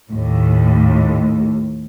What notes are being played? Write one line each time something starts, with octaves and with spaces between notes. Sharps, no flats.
D#2 A2